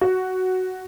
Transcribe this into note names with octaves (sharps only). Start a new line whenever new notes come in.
F#4